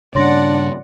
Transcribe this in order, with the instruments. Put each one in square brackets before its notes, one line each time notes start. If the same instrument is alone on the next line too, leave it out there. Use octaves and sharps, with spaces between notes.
[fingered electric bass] G2 C#3 [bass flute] D4 [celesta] C#5 C6 A#6 [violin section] D5 F#5